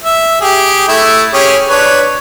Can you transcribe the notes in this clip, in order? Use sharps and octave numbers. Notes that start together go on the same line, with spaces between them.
E5
G4 G#4
A3 E4
C#4 G4 G#4
D4 B4 C#5